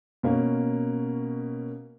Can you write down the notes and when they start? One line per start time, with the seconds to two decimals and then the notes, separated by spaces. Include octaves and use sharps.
0.23 B2 A#3 C#4